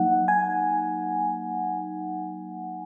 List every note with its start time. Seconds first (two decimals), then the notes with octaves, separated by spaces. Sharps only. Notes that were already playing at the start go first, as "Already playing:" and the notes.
Already playing: F#3 A#3 D#4 F#5
0.28 G#5